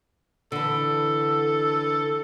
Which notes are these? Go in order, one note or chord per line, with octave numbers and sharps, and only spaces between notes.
D3 E3 A4